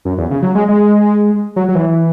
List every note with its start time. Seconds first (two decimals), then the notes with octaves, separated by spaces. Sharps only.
0.05 F#2
0.18 E2
0.31 C#3
0.42 F#3
0.55 G#3
0.69 G#3
1.56 F#3
1.69 F#3
1.75 E3